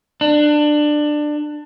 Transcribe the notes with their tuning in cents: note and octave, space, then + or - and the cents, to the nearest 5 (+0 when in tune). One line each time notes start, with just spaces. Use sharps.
D4 +20